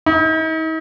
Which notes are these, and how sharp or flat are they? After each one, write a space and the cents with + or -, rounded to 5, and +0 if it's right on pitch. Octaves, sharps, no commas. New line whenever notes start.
D#4 +45